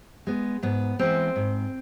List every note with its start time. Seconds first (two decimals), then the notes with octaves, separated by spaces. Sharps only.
0.27 G#3 B3
0.63 G#2 B3
0.99 E3 G#3 B3 C4
1.36 G#2